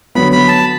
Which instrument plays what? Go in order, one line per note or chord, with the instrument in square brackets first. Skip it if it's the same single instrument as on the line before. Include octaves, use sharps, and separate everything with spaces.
[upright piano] D3 F#3 B3 [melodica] B5
[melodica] B5
A5